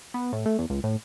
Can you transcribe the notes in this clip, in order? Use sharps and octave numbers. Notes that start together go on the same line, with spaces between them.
B3
A2
A3
E2
C#2
A2